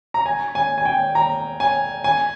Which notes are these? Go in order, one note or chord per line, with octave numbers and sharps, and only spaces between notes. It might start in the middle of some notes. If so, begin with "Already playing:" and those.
A#5
G#5
G#5
G#5
G5
A#5
G#5
G#5